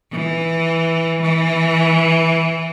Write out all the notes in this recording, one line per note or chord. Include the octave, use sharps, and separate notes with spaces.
E3
E3